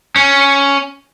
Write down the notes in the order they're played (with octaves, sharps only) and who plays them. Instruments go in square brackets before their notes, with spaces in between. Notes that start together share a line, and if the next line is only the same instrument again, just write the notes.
[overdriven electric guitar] C#4